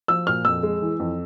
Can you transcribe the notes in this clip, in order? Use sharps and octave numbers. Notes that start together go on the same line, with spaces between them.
F3 E6
A#2 F6
F2 E6
G#3
E3
F2